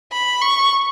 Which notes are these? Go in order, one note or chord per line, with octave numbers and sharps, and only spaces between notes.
B5
C#6